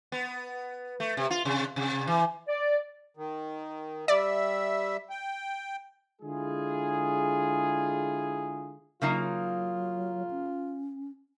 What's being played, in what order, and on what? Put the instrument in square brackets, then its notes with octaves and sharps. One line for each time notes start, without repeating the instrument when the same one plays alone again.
[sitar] B3
A3
C3
F4
C3
C3
E3
[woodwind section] D5
[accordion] D#3
[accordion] G3 E5 [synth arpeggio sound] D5
[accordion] G5
[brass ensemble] D3 G#3 E4 F4 G#4
[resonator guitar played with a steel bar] C#3 A#3 D#4 [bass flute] F#3 [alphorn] F4
[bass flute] C#4